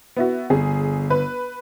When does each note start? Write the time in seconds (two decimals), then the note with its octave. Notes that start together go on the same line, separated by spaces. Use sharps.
0.16 B3 E4 F#4
0.50 G1 G#4
1.10 B4